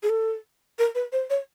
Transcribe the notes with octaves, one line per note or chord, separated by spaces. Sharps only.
G#4
A4
A#4
B4
C5
C#5